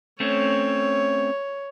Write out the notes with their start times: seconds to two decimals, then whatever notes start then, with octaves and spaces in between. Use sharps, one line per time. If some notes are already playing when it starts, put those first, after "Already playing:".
0.20 A3 C4 C#4 C#5